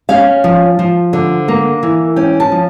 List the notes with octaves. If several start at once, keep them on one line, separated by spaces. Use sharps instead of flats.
C#4 F5
F3
F3
D3
A#3
E3
C#4 G5
A5
F3